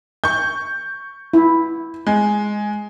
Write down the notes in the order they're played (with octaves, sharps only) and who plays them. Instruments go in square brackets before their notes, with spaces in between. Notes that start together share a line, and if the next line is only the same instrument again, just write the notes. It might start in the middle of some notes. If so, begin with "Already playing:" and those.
[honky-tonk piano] C#6 G6
[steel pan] E4
[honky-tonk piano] G#3